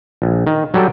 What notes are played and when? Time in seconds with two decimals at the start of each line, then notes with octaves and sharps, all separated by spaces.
0.22 A#1
0.47 D#3
0.74 F#3 G3 A4 G5